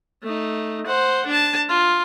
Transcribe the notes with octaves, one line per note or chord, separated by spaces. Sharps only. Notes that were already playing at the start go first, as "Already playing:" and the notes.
A3 D#4
C5 F#5
D4 A5
F4